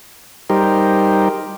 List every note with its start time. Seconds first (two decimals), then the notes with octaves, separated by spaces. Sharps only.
0.50 G3 D#4 G4 A#4 C5